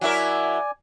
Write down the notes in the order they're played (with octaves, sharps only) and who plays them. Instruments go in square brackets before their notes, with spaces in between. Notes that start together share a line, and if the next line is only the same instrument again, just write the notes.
[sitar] F#3 E4 A#4 [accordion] D5 G#5